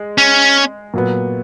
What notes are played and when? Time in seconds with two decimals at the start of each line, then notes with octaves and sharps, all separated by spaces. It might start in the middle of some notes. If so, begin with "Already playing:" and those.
Already playing: G#3
0.18 C#4
0.94 A#2 F#3 B3